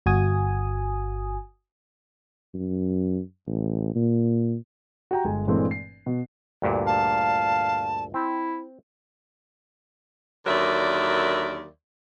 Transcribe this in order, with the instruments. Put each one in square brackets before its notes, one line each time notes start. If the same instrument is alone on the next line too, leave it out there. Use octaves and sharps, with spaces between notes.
[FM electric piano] G1 F#4 G#5 D#6
[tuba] F#2
A1
A#2
[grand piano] F#4 G4 G5 A#5
G1 G#3 G#5
G2 A#2 E3 G#3 A3 C4
C7
B2
[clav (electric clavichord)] D2 G2 A#2
[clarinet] F5 [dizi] A5
[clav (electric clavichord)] C4 [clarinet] E4
[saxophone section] D#2 D3 F#3 A#4 D5 E5